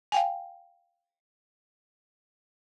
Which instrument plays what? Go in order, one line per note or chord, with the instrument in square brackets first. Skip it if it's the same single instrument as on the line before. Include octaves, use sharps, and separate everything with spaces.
[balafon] F5 G5 G#5